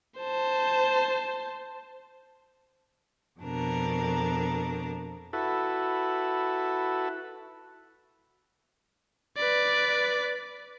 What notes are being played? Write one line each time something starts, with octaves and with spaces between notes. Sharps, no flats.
C5 A5
F2 B2 D4 A#4
E4 F#4 A4 B4
B4 D5